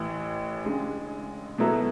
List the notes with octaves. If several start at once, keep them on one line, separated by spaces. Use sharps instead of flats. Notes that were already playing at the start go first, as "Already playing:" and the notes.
Already playing: A1 A2 E3
C#3 G#3 D4
B2 F#3 B3 E4 A4